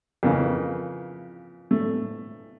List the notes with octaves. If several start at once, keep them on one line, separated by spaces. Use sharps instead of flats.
F2 C#3 E3 A#3
A3